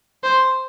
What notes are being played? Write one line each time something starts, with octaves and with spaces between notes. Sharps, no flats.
C5